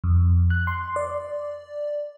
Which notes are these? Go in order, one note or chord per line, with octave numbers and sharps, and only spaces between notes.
F2
F#6
C6
D5